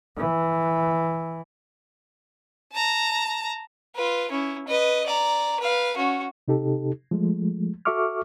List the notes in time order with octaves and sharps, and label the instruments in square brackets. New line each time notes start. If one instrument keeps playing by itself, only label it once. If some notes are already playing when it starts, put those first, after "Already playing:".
[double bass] E3
[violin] A5 A#5
[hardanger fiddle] F4 B4
C#4 E4
B4 D#5
D5 A#5
B4 F5
C#4 F#4
[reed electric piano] C3 D#4 G4 A4
F3 G#3 A3
F#4 A4 E5 C#6 D6 F6